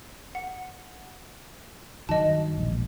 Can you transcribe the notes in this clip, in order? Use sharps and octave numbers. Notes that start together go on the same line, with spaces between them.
F#5
G2 D#3 F#3 D#5 A5
E1 A#1